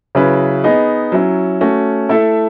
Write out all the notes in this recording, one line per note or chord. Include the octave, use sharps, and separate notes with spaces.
C#3 F#3 C#4 E4 B4
B3 D#4 G#4 D#5
F#3 C#4 E4
A3 C#4 F#4
A3 E4 A4 E5